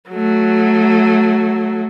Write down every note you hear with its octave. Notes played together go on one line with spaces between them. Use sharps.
F#3 A3